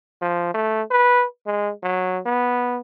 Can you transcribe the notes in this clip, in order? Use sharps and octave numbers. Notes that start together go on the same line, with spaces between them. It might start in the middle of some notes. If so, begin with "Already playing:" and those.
F3
A3
B4
G#3
F#3
B3